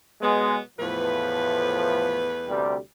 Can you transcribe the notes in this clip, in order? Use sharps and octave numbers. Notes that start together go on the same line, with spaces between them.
B2 F#3 G#3 B3
E2 A2 F3 A3 B4
D2 C3 G3